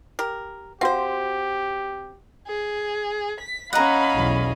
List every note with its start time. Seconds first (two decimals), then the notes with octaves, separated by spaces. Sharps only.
0.19 G4 A#4
0.81 C4 F#4 G4 C5 F5 F#5
2.48 G#4
3.40 B6
3.73 C#4 D#5 F5 F#5 A#5 B5
4.14 B1 E2